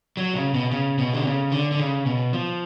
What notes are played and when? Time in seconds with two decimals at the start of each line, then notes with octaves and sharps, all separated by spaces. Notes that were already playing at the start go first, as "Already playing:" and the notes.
0.17 F#3
0.35 C#3
0.54 B2
0.71 C#3
0.98 B2
1.14 D3
1.26 C#3
1.52 D3
1.72 D3
1.80 C#3
2.06 B2
2.33 F3